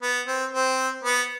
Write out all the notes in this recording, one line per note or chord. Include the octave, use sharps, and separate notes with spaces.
B3
C4
C4
B3